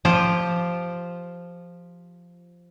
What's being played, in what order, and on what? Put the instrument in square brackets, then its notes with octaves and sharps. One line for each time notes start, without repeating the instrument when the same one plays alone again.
[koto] F3 F4 G4 C5